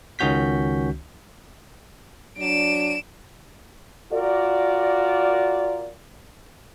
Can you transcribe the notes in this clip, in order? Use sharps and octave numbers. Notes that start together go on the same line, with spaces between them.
C#2 D#3 C#4 F#4 G6 B6
F#3 D4 D7 E7
F4 F#4 A#4 D5